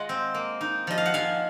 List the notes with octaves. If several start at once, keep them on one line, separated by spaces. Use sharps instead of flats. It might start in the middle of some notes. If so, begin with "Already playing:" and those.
Already playing: G#3 F4 D#5 F#5
C4
A#3
D#4
F3 D#5
F5
F#5
F3 F5 G#5